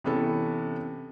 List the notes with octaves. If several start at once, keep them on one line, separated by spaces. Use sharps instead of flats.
C3 E3 B3 C#4 A4